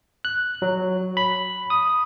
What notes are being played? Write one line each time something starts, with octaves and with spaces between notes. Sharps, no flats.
F#6
F#3
B5
D#6